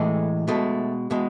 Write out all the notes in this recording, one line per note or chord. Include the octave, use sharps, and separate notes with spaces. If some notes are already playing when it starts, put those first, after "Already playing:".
Already playing: A2 E3 G#3 A3
B2 G#3 A3
B2 G#3